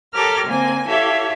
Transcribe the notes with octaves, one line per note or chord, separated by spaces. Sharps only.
G4 A4 A#4 C#5 D6 F6
D3 A#3 C4 G#5
E4 G4 A4 C#5 E5 F5